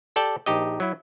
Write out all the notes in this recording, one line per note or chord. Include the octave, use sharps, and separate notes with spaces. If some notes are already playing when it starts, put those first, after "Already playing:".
G4 A4 D5 G5 A5
A#1 D#4 G4 D#5
F#3 E4